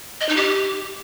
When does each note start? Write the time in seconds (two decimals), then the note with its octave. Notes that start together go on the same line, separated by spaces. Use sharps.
0.21 D#5
0.29 D#4
0.37 G4